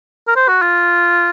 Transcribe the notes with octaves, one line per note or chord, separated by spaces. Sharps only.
A#4
C5
F#4
F4